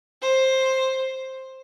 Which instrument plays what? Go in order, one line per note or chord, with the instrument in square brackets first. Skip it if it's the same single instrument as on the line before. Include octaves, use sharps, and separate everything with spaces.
[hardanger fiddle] C5